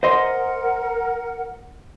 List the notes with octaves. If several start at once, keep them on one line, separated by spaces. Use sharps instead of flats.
A#4 C5 D#5 F#5 C6